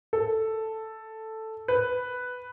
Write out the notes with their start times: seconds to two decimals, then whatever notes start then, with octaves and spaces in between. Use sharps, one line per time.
0.13 A4
1.68 B4